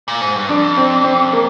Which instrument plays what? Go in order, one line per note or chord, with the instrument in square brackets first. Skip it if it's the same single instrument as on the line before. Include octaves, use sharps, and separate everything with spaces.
[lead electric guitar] A#2
G#2
G2
[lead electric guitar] F2 [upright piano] D4
[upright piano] C4
C4
A#3